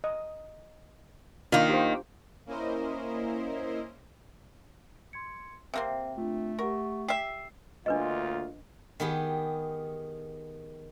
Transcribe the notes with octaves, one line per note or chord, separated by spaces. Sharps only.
D#5
D#3 A#3 D4 F4
G4 C5
A#3 C#4 E4 A#4 C5 D#5
C6 G#6 C#7
C3 A#3 C4 C5 E5
A3 D4 F4
G4 A#4 F#5 C#6
G4 E5 C7
D2 A#3 D4 F4 B4 D#5
D#3 B3 G4 G#4